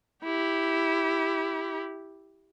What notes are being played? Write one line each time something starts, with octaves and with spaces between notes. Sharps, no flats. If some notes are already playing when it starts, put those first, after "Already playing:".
E4 G4